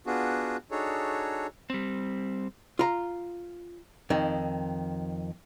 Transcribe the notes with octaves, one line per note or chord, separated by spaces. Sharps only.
B3 D4 F4 F#4 G#4
D4 D#4 F#4 G#4 A4 C#5
G3 C4
F4 A#5
F2 D#3